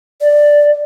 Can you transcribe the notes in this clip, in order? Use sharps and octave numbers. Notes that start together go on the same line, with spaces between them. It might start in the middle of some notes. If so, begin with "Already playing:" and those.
D5